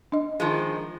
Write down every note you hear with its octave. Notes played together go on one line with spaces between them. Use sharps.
D4 D#5
D#3 F3 G#3